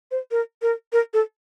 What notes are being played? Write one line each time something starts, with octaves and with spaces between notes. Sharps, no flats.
C5
A#4
A#4
A#4
A4